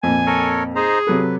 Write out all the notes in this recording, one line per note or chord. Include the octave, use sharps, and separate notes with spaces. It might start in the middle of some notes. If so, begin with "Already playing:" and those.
F2 A#2 G#5
A4 A#4 C#5
D#4 G#4 C5 A#5
C3 F#3 A4 B4